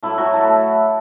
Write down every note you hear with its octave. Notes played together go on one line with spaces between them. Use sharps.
A2 F#3 A3 E4
F#3 F#4
A3 A4